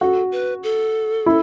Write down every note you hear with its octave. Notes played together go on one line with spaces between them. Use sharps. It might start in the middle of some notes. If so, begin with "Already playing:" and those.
F#4 A4
B4
A4
E4